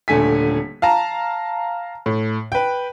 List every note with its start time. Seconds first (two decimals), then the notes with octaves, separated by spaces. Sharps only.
0.08 D#1 D3 A3 G#5 B6
0.82 F5 A5 A#5
2.06 A2
2.52 B4 G5